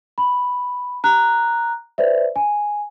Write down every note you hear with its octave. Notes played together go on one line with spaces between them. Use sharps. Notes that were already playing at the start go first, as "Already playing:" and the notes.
B5
A#5 F#6
B4 C5 D5 E5
G#5